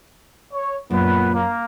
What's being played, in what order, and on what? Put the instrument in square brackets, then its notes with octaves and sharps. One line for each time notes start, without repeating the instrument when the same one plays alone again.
[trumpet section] C#5
[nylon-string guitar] F#2 [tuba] A#2 [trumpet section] B3 B4
[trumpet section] A#3